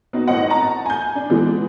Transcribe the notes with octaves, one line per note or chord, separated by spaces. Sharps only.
B3 D#4 F#4
G#1 A2 C4 D#5 F#5
A5 A#5
G#5 G6
D4
E3 G#3 B3